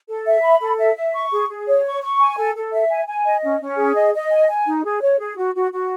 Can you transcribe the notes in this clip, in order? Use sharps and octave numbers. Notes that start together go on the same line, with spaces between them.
A4
E5
B5
A4
E5
E5
C#6
G#4
G#4
C#5
C#6
C#6
G#5
A4
A4
E5
G#5
G#5
D#5
C#4
C#4
G#4
D#5
D#5
G#5
G#5
D#4
G#4
C#5
G#4
F#4
F#4
F#4